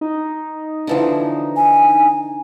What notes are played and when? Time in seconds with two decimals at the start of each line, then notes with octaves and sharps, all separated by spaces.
0.01 D#4
0.87 D3 E3 F3
1.56 G#5